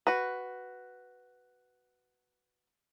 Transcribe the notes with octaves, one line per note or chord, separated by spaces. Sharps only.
F#4 B4